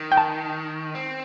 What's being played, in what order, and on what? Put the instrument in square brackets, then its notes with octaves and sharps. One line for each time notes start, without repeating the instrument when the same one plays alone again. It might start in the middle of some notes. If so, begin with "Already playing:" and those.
Already playing: [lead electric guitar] D#3
[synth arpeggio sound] G5
A5
[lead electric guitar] C4